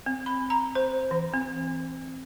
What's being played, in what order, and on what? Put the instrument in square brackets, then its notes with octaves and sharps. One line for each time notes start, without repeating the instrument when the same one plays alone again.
[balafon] C4
B5
A#5
C5
E3
C4